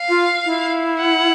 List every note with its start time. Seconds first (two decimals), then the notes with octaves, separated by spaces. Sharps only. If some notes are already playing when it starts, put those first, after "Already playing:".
Already playing: F5
0.09 F4
0.45 E4
1.00 F#5